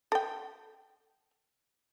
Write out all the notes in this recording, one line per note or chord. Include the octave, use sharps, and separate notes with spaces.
A4 G5